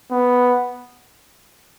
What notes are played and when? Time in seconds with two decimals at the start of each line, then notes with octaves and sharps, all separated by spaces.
0.11 B3